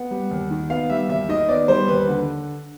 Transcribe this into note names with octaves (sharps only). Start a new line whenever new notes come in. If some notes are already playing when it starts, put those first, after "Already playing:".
Already playing: B3 F#5
G3
D#2
D#3
B3 F5
G3 E5
D#2 E5
D#3 D#5
B3 D5
G3 C5
D#2 B4
D3